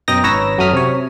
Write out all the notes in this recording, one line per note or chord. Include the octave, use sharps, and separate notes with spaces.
F#2 B2 D#5 G5 A#5 A#6
G#1 B4 C#5 A#5 E6 A#6
F#2 F#3 A3 D#6 F6 B6
C3 C#5